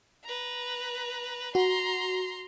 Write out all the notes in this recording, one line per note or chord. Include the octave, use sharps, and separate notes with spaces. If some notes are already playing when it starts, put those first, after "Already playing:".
B4 A#5
F#4 A#5 C6